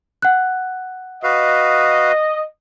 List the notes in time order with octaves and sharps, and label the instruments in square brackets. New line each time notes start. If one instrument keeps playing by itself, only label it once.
[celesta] F#5 F#6
[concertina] F#4 B4 F5 [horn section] D#5